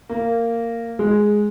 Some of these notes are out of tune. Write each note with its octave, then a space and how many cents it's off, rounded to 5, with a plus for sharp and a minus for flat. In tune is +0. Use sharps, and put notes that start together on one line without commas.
A#3 -15
G#3 +5